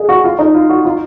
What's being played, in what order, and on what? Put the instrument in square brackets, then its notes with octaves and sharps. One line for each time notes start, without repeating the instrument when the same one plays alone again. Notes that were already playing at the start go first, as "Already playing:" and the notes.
Already playing: [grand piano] G#4 D#5
F#4
F4
D#4
F4
F#4
F4